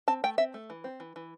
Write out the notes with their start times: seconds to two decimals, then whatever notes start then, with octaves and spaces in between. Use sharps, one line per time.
0.08 C4 A5
0.24 A3 G5
0.38 C4 E5
0.54 A3
0.70 E3
0.84 C4
1.00 E3
1.16 E3